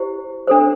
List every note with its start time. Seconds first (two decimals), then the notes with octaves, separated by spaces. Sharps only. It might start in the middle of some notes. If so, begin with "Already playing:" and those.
Already playing: E4 G4 C5
0.47 D4 A4 C5